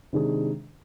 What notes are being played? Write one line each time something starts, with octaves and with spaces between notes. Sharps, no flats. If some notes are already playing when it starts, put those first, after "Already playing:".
C3 D#3 G#3 D4 G#4